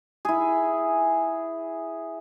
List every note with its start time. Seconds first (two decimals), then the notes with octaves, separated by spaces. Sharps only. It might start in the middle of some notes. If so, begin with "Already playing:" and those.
0.25 E4 G#4